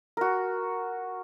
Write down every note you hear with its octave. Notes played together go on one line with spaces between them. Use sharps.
F#4 A#4